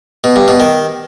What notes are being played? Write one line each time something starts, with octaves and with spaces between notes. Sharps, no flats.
B2
G2
B2
D#3